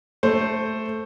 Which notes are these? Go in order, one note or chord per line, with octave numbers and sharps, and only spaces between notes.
A3 C5